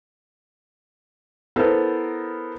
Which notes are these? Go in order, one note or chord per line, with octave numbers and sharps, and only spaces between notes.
B3 E4 A4 A#4 C5